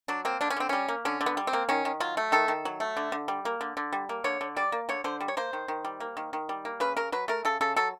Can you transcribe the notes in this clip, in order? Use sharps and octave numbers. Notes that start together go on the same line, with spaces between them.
F#3 D4
A#3 C4
D3 D4
C#4
D3 C4
G3 C#4
A#3
D3 C#4
D3
B3
G3
C4
A#3
D#3 C#4
D#3
F#3 F4
A3
D#3 A4
D#3
F#3
A3
D3
D3
G3
A#3
D3
D3
G3
A#3
D3 C#5
D3
G3 D5
A#3
D3 C#5
D3 C5
G3
C#5
A#3 C5
D#3
D#3
G3
A#3
D#3
D#3
G3
A#3
C#3 B4
C#3 A#4
F#3 B4
A3 A#4
C#3 A4
C#3 A4
F#3 A4